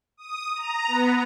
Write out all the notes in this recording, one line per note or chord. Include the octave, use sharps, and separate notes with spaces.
D#6
A#5
B3